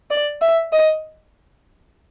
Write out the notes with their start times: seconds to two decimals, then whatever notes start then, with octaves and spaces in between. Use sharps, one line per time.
0.11 D5
0.42 E5
0.73 D#5